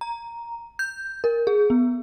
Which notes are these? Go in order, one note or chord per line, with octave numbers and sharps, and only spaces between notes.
A#5
G6
A#4
G#4
B3